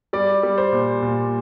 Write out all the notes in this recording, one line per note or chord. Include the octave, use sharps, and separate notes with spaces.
G3 D5
G3
C5
A#2
A#2